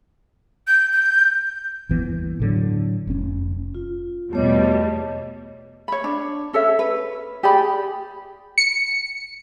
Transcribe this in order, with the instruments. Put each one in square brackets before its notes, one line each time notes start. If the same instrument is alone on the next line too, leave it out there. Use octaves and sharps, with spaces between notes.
[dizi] G6
G6
[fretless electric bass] G1 D#2 E3 B3
A2 D3 F#3
F1 C#4
[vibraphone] F4
[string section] E2 B2 G3 [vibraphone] A3 C#5 D#5
[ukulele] C#5 B5
D4
C#4 A4 C#5 E5
B4
G4 G#4 D5 B5
[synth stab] C#7